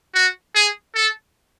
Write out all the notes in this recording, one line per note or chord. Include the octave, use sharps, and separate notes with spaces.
F#4
G#4
A4